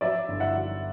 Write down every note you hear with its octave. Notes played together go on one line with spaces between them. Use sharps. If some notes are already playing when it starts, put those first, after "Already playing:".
F#3 D5 E5
G1
E5 F#5
F#3